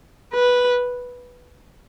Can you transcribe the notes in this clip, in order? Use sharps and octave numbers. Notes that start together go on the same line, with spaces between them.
B4